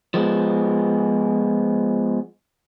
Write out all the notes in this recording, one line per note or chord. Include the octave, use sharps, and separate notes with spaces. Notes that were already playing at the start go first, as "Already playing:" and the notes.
F3 G#3 B3